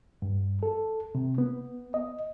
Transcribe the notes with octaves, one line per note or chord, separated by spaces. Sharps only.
G2
A4
C3
B3
D#5